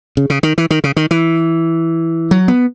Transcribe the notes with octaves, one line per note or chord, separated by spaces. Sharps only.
C#3
C#3
D#3
E3
D#3
C#3
D#3
E3
F#3
B3